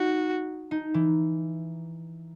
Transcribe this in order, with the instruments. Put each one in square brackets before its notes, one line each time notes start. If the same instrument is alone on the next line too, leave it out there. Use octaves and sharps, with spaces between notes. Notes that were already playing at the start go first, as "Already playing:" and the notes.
Already playing: [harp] D#4 [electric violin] F#4
[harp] D#4
E3